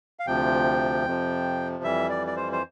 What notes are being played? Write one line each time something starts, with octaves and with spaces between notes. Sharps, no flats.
F5
D2 C3 F3 G5
F2 C3 F3
F2 E3 G3 E5
D5
D5
C5
C5